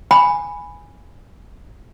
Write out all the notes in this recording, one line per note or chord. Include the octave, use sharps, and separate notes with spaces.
G#5 B5